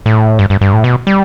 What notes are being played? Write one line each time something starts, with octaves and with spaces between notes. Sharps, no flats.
A2
G2
G2
G2
A2
B2
G3